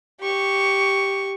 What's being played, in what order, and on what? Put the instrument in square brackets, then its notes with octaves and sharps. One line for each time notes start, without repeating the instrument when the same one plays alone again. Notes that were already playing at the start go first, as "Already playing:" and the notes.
[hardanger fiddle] G4 C#6